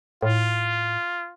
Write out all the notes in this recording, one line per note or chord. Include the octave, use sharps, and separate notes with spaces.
A2 F4